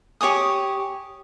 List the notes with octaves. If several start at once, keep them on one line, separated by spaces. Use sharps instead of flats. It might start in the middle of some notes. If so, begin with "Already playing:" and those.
G4 C#5 G#5 D#6